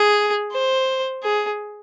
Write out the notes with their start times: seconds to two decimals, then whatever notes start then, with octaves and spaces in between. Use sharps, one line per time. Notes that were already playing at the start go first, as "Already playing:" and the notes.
Already playing: G#4
0.53 C5
1.23 G#4